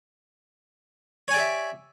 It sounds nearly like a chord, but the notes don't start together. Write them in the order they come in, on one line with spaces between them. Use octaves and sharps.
C#5 G#5 D5 G4 E5